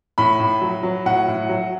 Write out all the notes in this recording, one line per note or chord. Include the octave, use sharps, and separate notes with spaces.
A2 B5
A2
F#3
F#3
A2 F#5
A2
F#3